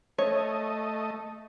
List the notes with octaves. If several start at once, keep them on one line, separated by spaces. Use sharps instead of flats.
A3 C#5 D#5